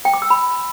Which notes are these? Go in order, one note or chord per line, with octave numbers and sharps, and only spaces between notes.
G5
D6
E6
B5